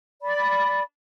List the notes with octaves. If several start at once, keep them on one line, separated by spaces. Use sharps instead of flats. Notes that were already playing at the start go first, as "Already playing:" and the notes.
D5 B5